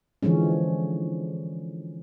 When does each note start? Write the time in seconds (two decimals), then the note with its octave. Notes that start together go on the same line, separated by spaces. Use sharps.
0.23 D3 E3 F3 G#3 C#4